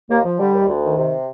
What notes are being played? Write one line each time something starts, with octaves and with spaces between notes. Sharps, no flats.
D#2 A#3
F3
D3 G3
D#2
D2
D#3
C3